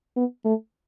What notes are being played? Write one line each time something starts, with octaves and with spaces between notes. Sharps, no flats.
B3
A3